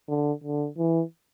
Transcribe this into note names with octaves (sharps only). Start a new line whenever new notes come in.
D3
D3
E3